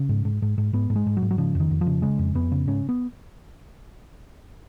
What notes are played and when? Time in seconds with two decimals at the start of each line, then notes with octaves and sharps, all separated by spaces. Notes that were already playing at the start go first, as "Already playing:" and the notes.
Already playing: C#3
0.09 G#2
0.25 G#2
0.42 G#2
0.58 G#2
0.73 G#2 B3
0.90 G#2
0.96 G#3
1.06 G#2
1.17 F#3
1.22 G#2
1.31 F#3
1.38 C#3 F3
1.55 F2 D#3
1.71 F2
1.81 F3
1.87 C#3
2.02 C#3 G#3
2.19 F2
2.35 F2 B3
2.52 C#3
2.67 G#2 C#4
2.89 B3